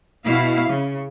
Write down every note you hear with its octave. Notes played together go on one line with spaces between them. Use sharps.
B2 E4 F5
C#3